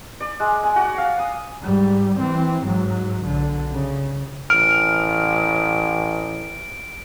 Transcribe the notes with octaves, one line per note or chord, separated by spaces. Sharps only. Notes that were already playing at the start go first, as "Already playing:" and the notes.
D5
G#3
G#5
F#4
F5
D#6
G#2 G3
E3 C4
G#2 F#3
B1 D3
C#3
A1 F6 D7